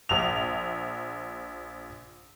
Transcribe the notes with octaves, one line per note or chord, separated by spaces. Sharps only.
A#1 F7